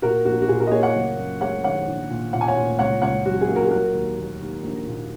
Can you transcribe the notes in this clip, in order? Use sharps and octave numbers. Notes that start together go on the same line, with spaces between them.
A#2 F#4 A#4
A#1 F#4
F#4
A#2 G#4
F#4 A#4
D#5
A#3 G#4 C#5
C#5 F#5
F#1
F#2
G#3 C#5 F#5
D#3 C#5 F#5
A#1
A#2
A#2 F#5
G#5
C#5 F#5
A#2
C#2 C#5 F#5
C#2 C#5 F#5
F#3 F#4
G#4
A#3
F#4 A#4
G#4
F#3 F#4 A#4
D#2
D#2
D#2
A#1
A#2